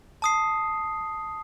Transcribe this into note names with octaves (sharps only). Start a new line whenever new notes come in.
A5 D#6 C7